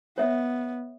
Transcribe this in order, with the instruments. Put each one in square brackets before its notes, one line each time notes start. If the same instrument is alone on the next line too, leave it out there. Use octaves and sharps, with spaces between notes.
[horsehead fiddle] B3 [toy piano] C#5 E5